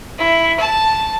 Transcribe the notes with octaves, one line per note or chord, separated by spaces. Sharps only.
E4
A5